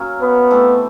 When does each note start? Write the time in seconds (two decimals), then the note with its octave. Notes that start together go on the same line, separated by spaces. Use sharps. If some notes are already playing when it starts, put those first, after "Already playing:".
Already playing: F#3 A#3 C#4
0.21 B3
0.50 E3 A3 C4